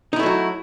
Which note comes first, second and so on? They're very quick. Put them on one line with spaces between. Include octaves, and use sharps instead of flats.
D#4 E4 A3 F#3 F#4